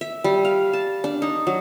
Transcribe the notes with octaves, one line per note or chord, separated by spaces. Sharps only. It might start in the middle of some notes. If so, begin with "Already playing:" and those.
E5
G3
F5
A5
D4
D#4
F#3